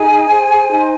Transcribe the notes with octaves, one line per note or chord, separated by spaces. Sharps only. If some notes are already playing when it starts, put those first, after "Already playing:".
Already playing: D#4 G#4 G#5
C5
D#4